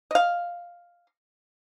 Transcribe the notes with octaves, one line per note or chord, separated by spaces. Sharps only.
D#5 F5